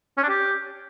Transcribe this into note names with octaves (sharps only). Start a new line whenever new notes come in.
C#4
D4
G4